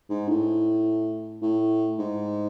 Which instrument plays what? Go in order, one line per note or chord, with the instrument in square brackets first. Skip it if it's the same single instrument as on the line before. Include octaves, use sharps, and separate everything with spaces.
[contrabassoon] G#2
A2
A2
G#2